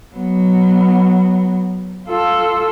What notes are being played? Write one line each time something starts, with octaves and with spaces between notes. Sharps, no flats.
F#3 B3
F4 A4